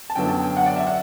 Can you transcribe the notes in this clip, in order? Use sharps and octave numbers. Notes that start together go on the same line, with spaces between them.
A5
F#2 D3 F#3 B3 G5
A5
G5
F#5
D5
E5
F#5